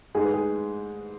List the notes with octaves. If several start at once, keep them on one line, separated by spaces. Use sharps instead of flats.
G#2 G#3 G#4
B4
G#4